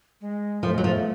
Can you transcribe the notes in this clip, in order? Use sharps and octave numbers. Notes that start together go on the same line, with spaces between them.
G#3
F3 A3
F#3 G#3
F3 A3